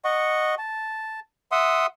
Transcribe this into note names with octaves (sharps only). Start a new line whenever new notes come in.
D#5 F#5 C#6
A5
E5 F#5 C6 D#6